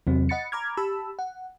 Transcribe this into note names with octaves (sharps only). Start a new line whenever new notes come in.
E2 C3 F#3 C4
D#5 F#5 B5 A6 C#7
A#5 B5 D6 F6 G#6
G4 A5 B5 E6
F#5